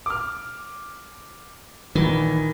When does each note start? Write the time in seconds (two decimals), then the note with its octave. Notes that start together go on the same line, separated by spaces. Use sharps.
0.06 D6 F6
1.95 A#1 D#3 E3